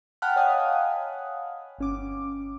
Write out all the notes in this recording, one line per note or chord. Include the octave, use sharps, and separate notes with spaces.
F#5 G5 A5 B5 F6 F#6
C#5 D#5 F5 F#5 G#5 D#6
G1 C#4 D6